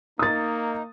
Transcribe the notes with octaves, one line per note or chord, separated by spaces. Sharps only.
A#3 D#4 D#6 A6